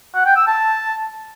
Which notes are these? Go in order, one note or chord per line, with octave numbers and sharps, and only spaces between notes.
F#5
G5
E6
A5